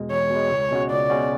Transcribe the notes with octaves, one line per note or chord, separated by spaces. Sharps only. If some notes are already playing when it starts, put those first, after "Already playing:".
Already playing: E2 B2 G#3
E2 C#5
B2
G#3
C#2
B2 G#3 C#4 F#4
C#2 D5
B2 G#3 C#4 F#4